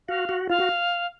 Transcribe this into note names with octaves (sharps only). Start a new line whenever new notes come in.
F#4 F5
F#4
F4 F5
F#4